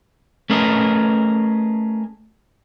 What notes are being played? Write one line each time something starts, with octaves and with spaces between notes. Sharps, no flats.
A3 C#4 G#4 A#4 B4 D#5